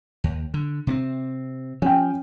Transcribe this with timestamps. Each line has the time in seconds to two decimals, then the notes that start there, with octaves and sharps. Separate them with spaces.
0.24 D#2
0.54 D3
0.87 C3 A#3 C4
1.82 F3 C#4 G5